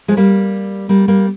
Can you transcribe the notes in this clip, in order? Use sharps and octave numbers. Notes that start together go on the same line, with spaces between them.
F3 G#3
G3 A#3
G3 A#3
G3 A#3